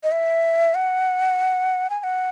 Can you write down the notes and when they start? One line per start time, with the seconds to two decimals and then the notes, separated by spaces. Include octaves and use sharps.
0.04 D#5
0.12 E5
0.75 F#5
1.90 G#5
2.00 G#5
2.04 F#5